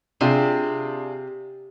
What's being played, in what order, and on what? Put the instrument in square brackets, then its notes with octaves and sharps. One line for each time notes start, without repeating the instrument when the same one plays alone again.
[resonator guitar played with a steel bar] C3 [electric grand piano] D4 F4 G#4